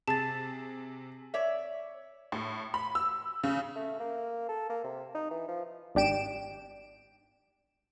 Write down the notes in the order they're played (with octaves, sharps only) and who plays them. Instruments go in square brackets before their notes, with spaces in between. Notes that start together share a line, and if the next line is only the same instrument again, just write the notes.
[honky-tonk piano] C3 [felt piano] G#4 [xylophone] A5 A6
[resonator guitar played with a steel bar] C#5 D5 E5
[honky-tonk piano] A2
B5
E6
C#3
[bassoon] A3
A#3
A4
A#3
C3
D#4
E3
F3
[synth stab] G#1 D4 G4 D7 E7